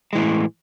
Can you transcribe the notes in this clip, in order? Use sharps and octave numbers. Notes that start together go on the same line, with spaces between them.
A2 E3 G#3